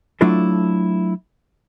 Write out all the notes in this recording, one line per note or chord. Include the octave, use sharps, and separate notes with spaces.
F#3 A3 D4 E4 F4 A4